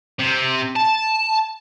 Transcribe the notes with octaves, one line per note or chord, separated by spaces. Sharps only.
C3
A5